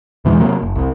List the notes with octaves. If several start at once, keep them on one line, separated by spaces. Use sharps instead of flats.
E2 B2 E3 G#3
C3 F#3 A#3
F#1
C2